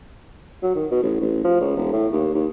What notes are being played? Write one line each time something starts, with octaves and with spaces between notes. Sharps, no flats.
F#3
D#3
B2
A1
A1
F3
C#2
E1
A2
D#2
D#2